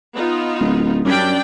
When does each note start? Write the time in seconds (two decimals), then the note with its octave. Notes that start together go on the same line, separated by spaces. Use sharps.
0.15 B3 D#4 F4
0.60 D1
1.05 F#2 G3 C#4 D4 G4 D5 G5